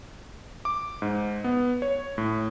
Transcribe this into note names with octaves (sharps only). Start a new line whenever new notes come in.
D6
G#2
B3
C#5
A2